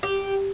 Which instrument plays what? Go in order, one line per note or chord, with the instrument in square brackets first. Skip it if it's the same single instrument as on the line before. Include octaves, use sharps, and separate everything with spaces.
[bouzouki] G4